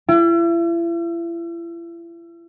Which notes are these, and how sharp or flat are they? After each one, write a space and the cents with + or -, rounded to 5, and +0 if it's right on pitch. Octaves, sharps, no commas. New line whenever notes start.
E4 +40